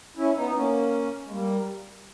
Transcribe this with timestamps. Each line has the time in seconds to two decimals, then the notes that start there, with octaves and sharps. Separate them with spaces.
0.17 C#4 E4
0.36 B3 D#4
0.55 A#3 C#4
1.27 G#3
1.30 G3 A#3